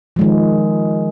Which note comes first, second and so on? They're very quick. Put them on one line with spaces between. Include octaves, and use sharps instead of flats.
F3 G#3 D#3